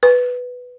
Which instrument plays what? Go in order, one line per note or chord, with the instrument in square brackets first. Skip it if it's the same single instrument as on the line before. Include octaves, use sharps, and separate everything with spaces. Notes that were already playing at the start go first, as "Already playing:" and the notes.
[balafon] B4